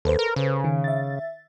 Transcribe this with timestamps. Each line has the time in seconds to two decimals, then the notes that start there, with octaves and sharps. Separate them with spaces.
0.05 D#2 A4 B4 C5
0.19 A#4
0.36 C#3
0.64 D#3
0.84 E5 A6